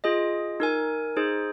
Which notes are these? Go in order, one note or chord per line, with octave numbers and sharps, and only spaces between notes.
F4 G#4 D#5
D#4 A#4 G#5
D#4 G#4 C5